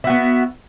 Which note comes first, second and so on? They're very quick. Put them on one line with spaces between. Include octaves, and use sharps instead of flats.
E4 F#4 B3